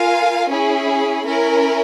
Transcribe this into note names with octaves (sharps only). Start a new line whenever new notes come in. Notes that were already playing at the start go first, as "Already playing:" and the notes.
Already playing: F4 A#4 F5 G#5
C#4 E4 G#4
C#4 E4 A#4